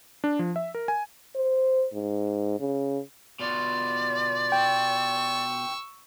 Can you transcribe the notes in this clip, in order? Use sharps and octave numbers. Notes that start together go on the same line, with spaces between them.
D4
F3
E5
A#4
G#5
C5
G#2
C#3
B2 F4 D5
G5 C#6 E6